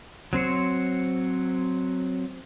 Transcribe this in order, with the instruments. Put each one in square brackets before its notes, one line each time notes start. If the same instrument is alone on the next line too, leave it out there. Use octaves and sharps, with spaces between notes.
[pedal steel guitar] F#3 C4 C5 C#5